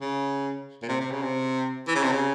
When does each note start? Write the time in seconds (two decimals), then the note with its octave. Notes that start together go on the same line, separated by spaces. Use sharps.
0.01 C#3
0.82 A#2
0.88 C3
1.00 C3
1.11 C#3
1.22 C3
1.87 E3
1.95 C#3
2.03 C3
2.12 C#3